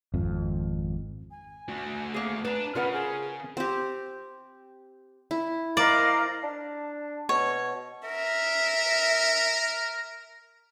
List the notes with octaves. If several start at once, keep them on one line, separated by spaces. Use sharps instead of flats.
G#1 F2
G#5
A3 F#4
A#3 G#4
D4 B4 A#5
C#3 F4 A#4 B4 F#5
G#4
C4 G4
E4
A#4 C5 D5 D#5 F5
D4
B2 C#5
A#4 E5